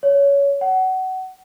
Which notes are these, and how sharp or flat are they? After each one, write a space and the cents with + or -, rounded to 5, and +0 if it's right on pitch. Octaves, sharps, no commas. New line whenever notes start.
C#5 +20
F#5 +25